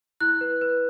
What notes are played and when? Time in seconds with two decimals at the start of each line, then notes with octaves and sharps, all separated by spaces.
0.20 E4 F#6
0.41 B4
0.61 B4